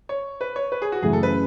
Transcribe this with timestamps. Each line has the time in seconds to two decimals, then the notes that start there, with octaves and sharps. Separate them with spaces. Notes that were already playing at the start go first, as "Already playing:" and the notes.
0.09 C#5
0.41 B4
0.56 C#5
0.72 B4
0.82 G#4
0.92 F#4
1.02 F#2 C#3 E3 A3 C#4 G#4
1.13 A4
1.23 B4